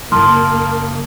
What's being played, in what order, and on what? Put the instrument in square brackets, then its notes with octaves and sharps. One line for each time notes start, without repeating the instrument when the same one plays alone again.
[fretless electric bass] F#2 C#3 F#3 [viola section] A#3 [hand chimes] A5 D#6 F6 [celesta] C6